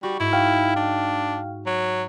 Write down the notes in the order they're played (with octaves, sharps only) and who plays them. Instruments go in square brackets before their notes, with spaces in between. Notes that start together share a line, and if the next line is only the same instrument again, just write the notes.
[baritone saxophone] G3 [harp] F#4
[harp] G#2 [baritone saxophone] E4
[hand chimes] F5 G5 F6
[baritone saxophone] D4
F#3